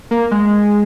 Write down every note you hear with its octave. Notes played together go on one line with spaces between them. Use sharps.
A#3
G#3